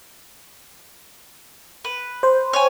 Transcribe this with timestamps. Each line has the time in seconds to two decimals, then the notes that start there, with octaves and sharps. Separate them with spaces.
1.85 B4
2.23 C5
2.53 C#5 G#5